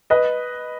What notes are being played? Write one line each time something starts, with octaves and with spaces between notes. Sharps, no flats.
B4 D#5